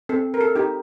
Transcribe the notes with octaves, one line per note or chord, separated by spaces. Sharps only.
C4 A4
A#4
A4
D#4 G4